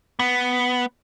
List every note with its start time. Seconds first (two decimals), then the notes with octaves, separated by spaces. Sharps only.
0.19 B3